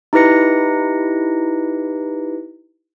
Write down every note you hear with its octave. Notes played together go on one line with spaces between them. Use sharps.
D#4 E4 G4 B4 A#6 C#7